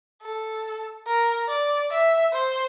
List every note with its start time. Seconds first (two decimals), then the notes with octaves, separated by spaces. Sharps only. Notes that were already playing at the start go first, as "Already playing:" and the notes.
0.22 A4
1.07 A#4
1.48 D5
1.91 E5
2.33 C5